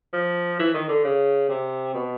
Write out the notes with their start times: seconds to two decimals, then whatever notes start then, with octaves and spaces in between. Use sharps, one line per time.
0.13 F3
0.59 E3
0.74 D#3
0.89 D3
1.04 C#3
1.49 C3
1.94 B2